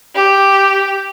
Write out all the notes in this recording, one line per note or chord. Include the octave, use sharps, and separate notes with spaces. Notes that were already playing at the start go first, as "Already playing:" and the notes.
G4